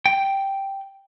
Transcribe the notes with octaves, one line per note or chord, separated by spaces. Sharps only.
G5